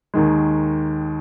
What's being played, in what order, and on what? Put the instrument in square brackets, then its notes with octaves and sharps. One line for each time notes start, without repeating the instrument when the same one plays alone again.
[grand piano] D#2 D#3 G#3